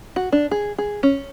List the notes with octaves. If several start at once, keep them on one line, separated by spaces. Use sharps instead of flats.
F#4
D4
G#4
G#4
C#4